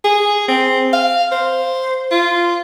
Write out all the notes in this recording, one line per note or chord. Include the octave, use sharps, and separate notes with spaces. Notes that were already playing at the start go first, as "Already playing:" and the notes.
G#4
C4
F5
C5
F4